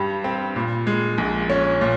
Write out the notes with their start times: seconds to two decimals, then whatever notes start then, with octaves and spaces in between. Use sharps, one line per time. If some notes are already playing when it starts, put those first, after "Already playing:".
Already playing: G2 G3
0.24 C4
0.56 A#2
0.87 G#3
1.18 A#1
1.50 C#4
1.81 A#2